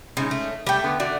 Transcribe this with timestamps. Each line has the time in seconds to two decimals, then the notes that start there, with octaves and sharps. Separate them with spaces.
0.17 C#3 G#3 C#4 D#4
0.31 A3
0.67 G3 A3 G5
0.84 D3 B3
1.00 D3 A3 F#4 D5